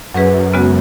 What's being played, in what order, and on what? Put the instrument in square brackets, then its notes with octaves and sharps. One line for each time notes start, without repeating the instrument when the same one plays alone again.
[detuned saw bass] F#2 [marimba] F#3 C#4 G#4 B4
[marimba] C#3 G#3 B3 F#4